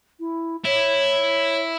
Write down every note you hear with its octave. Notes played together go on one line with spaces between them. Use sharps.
E4
E4 C#5